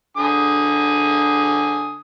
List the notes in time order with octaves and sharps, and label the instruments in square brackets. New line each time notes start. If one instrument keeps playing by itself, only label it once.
[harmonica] D3 G#5 D#6